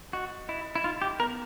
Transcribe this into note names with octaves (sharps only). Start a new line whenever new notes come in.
F#4 D#5
E4 D#5
E4
D#4 F4
G4
B3 A#4